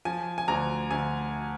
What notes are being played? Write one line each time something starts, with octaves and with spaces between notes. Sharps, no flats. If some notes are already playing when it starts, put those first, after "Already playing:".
F3 G#5
G#5
D2 A#5
D2 G#5